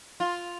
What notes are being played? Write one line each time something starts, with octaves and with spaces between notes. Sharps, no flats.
F4